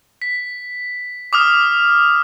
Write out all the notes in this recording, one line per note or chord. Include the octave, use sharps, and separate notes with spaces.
B6
D6 D#6 F6